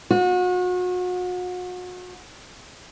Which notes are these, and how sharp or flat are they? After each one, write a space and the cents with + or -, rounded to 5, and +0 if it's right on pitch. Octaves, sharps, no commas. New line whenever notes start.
F#4 -35